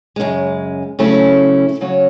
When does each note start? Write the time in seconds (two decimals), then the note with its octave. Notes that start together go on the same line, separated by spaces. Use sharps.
0.16 F#2 C#3 G#3
0.99 C#3 F#3 A3 C#4 E4
1.81 C#3 F#3 C#4 F#4 C#5